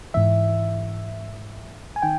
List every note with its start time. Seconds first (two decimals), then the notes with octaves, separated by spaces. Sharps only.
0.14 G#2 E3 E5
1.96 G#5
2.02 D#3 G5